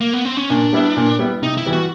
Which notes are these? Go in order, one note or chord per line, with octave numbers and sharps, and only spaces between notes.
A#3
B3
C4
C#4
A#2 D4
G3 B3 E4
A#2
G3 B3 E4
C3 D#4
E4
E3 G3 B3
F#4